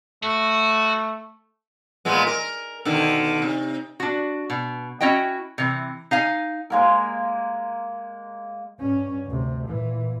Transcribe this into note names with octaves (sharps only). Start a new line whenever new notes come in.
A3 F#4
A#2 G#3 B3
A#4
B2 D3 D#3
C3
D4 F#4
B2
C#4 E4 F#4 D#5 G5
C3 E3
D#4 F5 G#5
G#3 A#3 A#4
G2 C#4
D2 C3
A#2 E3